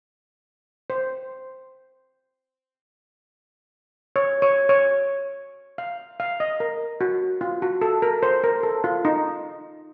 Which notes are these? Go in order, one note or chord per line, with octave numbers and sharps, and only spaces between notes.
C5
C#5
C#5
C#5
F5
F5
D#5
A#4
F#4
F4
F#4
A4
A#4
C5
A#4
A4
F4
D#4